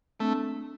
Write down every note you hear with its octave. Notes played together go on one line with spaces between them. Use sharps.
A3 C4 D4